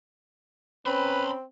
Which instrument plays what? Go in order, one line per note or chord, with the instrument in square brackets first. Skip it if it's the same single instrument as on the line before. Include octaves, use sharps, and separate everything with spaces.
[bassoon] C4 [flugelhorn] C#4 [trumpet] B4 [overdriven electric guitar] B5 C6